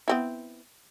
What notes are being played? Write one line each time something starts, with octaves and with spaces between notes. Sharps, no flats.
B3 C4 E4